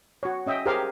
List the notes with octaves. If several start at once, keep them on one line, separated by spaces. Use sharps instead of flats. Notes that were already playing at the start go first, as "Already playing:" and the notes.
F#4 C#5
C#4 D#5 E5 G5
G4 G#4 A#4 C5 F5